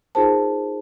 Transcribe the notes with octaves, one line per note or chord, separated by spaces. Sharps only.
D#4 F4 G#4 A#4 C5 A5